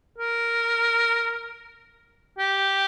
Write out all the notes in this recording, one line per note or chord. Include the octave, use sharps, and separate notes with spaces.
A#4
G4